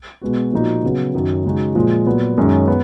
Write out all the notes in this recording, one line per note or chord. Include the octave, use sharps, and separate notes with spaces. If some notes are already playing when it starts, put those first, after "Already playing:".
B2 G#3 B3 F#4
A#2 F3 A#3 D#4 F#4
C#3 F#3 B3
F#2 D#3 F#3
C#3 G#3 D#4 F#4
A#2 F3 G#3
A#2 F#3 B3
F#2 D#3 G#3 C#4
B3